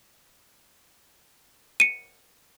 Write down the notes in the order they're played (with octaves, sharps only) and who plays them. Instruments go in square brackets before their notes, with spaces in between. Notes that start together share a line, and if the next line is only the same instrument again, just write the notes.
[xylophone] C#7 D#7